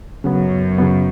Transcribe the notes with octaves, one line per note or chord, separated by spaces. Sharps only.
F#2 C#3 F#3 B3
C#3 F#3 B3